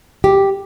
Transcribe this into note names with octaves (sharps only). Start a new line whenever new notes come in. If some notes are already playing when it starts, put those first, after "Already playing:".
G4